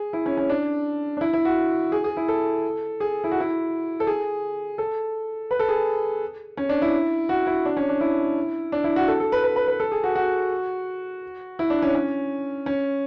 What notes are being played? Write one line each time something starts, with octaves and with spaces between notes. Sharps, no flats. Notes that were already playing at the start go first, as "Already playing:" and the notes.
Already playing: G#4
E4
C#4
C#4
D4
D4
E4
E4
F#4
G#4
G#4
E4
A4
G#4
E4
F#4
E4
A4
G#4
A4
B4
A4
G#4
C#4
D4
E4
F#4
E4
D4
C#4
D4
E4
D4
E4
F#4
A4
A4
B4
B4
B4
B4
A4
G#4
F#4
F#4
E4
D4
C#4
C#4
C#4